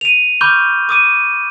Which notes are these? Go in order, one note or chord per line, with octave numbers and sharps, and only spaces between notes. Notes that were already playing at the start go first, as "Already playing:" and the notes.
D#7 F7
B5 C#6 D6 F6 G6 G7
D6 D#6 D#7